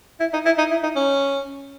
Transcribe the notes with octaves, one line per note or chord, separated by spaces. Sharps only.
E4
D#4
E4
D#4
E4
D#4
C#4